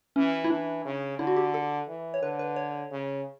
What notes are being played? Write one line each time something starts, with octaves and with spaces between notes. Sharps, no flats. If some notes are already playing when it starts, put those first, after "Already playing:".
E3 C#4
E4
E3 D4
C#3
D3 E4
F#4
G4
A4
E3
C#5
D3 B4
B4
C#5
C#3